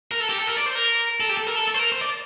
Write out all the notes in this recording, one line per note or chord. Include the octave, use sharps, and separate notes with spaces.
A#4
A4
G4
A4
A#4
D5
C5
A#4
A4
G4
A4
A#4
A4
A4
C5
A#4
C5
D5